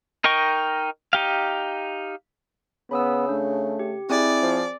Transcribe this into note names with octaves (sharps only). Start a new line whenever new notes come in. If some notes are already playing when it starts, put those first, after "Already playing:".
D#4 A#4 D#5 G5 C#6
D#4 G4 F5
C#3 B3 B5 D#6 E6
A3 D4
G4
C4 E4 G#4 D5 G#5
F3